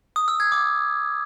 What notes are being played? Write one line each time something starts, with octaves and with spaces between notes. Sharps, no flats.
D#6
E6
G#6
D6